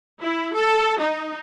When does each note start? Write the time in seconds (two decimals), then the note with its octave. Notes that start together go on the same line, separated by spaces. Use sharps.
0.21 E4
0.55 A4
1.00 D#4